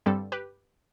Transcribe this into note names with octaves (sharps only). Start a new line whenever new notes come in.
G2 D3 G3 C4 A4
G4 B4